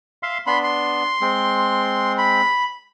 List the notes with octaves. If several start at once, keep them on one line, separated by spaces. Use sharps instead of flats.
E5 F5 C6
B3 D4 B5 C6
C6
G#3 C4
B5